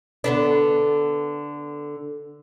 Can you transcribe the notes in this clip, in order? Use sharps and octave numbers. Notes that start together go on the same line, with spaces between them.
D3 B3 D4